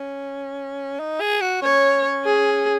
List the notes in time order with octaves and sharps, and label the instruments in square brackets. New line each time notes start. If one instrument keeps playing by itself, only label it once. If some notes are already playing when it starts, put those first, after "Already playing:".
Already playing: [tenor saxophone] C#4
D#4
G#4
F#4
[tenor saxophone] C#4 [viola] C#5
[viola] G#4